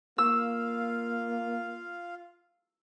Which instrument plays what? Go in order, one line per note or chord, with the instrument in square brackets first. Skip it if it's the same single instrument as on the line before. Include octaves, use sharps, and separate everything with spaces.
[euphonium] A#3 [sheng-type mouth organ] F4 F5 [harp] E6